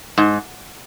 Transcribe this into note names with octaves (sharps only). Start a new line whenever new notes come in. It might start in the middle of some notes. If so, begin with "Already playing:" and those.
G#2